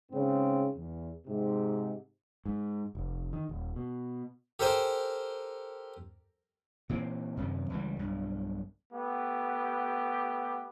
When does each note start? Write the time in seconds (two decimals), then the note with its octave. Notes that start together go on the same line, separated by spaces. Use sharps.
0.11 G#2 C#3 C4
0.76 E2
1.27 G#2 C3
2.46 G#2
2.95 F1
3.33 D#3
3.49 D#1
3.76 B2
4.59 G4 A4 A#4 C5 G5 G#5
6.89 A#2 E3 C4
7.37 F#2 C3 D#3
7.70 C#2 E3 G3
7.99 B1 G2
8.93 A3 B3 G4